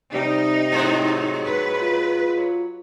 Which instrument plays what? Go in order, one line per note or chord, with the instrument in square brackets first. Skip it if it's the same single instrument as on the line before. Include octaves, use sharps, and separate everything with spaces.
[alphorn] C3 [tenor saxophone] G3 [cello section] D#4
[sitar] G#2 G#3 C4 [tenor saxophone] F#3
[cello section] B4
[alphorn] F4
[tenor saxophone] F#3